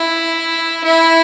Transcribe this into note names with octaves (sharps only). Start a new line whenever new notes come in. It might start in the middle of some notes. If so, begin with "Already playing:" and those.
Already playing: E4
E4